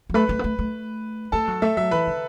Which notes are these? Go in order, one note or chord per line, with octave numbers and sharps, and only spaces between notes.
F#3
A3 B4 B5
A3
B3
A3
A3
A3 A4 A5
F#3
A3 E5
F#3 E5
E3 B4 B5
D3